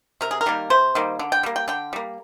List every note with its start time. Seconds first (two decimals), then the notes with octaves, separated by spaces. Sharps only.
0.21 C3 A#4
0.31 G#4
0.41 A#4
0.46 D#3 G3 A#3
0.70 C3 C5
0.95 D#3 G3 A#3
1.19 D3
1.32 G5
1.43 G3 A#3
1.56 G5
1.68 D3 G5
1.93 G3 A#3